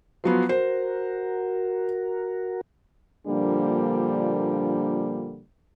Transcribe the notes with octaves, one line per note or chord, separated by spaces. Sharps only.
F3 F#3 B3 C6
F#4 A#4 C5
A#2 D3 F3 G3 A#3 D4